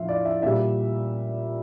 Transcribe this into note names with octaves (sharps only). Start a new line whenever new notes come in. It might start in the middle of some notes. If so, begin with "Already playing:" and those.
Already playing: A2 F3 F4 E5 F5
D5
E5
A#2 G3 E5